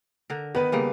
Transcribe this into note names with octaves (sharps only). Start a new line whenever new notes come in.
D3 A#4
D#3 B3 B4
C#3 G3 A#3